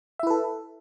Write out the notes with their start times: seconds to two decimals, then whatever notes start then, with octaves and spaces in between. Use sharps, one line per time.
0.19 E5
0.23 E4
0.27 B4
0.30 A4